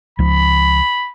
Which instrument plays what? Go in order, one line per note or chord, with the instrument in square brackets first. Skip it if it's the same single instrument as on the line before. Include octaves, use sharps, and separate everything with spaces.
[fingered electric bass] C#2 F3 [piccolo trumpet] B5